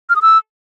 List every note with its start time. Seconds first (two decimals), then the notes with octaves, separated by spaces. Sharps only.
0.10 F6
0.16 D#6
0.22 E6